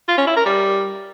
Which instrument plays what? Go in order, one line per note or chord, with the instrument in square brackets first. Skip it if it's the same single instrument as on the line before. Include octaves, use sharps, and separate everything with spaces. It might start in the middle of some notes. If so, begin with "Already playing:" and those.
[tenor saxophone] F4
C#4
E4
A#4
G3